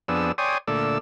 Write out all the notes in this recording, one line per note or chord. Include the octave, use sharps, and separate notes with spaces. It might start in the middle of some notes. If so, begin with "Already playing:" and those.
F2 B3 D4 G#4 E6
C#5 D5 G5 G#5 C6 D#6
A#2 D3 A3 D5 E6